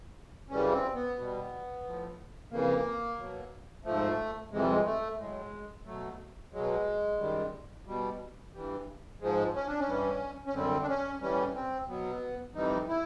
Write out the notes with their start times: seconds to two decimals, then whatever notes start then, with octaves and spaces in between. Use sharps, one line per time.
0.49 F#2 C#3 E3 G3 C#4
0.72 C4
0.94 B3
1.17 B2 G3
1.84 A2 F3
2.51 F2 C#3 E3 A#3
3.18 B2 F#3
3.84 G#2 F3 A3
4.51 F2 C3 E3 G#3
4.60 G3
4.69 G#3
4.85 A3
5.18 A2 F#3 G#3
5.85 B2 F#3 A3
6.52 B2 F#3 G#3
7.19 F#2 D#3 G3
7.86 B2 G3
8.53 G2 E3 G3
9.20 G#2 F3 G#3
9.54 C#4
9.67 D4
9.79 C#4
9.87 G2 E3 G3
10.46 C#4
10.54 F#2 D3 G3 C4
10.82 D4
10.88 C#4
11.21 A2 E3 G3 C#4
11.55 C4
11.88 B2 F#3 B3
12.55 F2 C3 E3 G3 D#4
12.88 E4